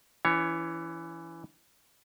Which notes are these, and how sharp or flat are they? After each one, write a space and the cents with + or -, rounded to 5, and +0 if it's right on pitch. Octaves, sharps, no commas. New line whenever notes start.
E3 +15 C#4 +45 C#5 +0